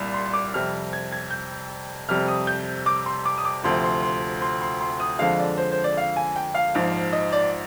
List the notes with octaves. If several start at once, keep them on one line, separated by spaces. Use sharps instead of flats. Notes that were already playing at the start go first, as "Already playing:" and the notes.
Already playing: C2 A#2 G3
C6
D6
F2 C3 G3 F6
G#6
G#6
G6
F2 C3 G3 F6
D#6
G6
D6
C6
D6
D#6
D6
D2 C3 F3 C6
C6
C6
C6
C6
C6
D#6
F2 D3 F3 G#3 F5
D5
C5
C5
D5
F5
G#5
G5
F5
A#1 G#2 F3
D#5
D5